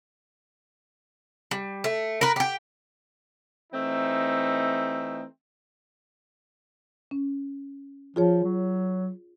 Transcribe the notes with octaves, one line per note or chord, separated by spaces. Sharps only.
G3
A3
A#4 B4
G4 G5
E3 A3 C4 D#4
C#4
F3 F4 G#4 C#5
F#3